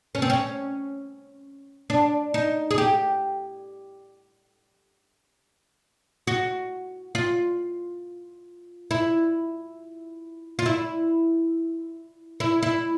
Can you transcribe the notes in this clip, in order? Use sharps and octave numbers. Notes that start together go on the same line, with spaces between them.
C#4
C4
C#4
D4
D#4
G#4
G4
F#4
F4
E4
F4
E4
E4
E4